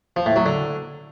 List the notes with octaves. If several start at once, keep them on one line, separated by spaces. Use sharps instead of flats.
F3
A2
F#3
D3